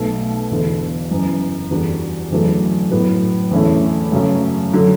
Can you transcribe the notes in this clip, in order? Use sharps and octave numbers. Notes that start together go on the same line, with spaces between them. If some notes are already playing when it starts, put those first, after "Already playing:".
Already playing: B1 B2 A3
E1 E2 D3
F#1 F#2 E3
E2 D3 G3 D4 F#4
F#1 E2 D3 F#3 A3
A2 F#3 B3
E2 D3 A3 C#4 E4
F#2 C#3 F#3 A3 C#4
D3 F#3